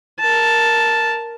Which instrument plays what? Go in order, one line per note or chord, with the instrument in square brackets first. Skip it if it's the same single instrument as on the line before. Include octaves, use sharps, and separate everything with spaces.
[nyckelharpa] A#4 A5